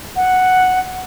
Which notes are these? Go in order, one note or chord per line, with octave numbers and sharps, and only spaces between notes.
F#5